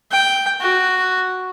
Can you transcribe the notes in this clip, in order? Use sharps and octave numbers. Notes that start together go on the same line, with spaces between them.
G5
F#4